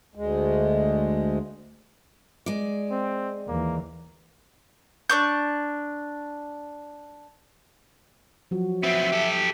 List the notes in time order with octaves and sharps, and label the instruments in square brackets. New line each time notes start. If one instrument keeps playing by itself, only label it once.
[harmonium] D2 G#3
[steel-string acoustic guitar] G#3 D5
[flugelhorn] C4
[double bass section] D#2 E3 [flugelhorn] A#3
[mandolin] D4 C#6 G6
[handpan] F3 F#3 F#4
[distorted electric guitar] B3 C4 [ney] E5
[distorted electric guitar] G4 A4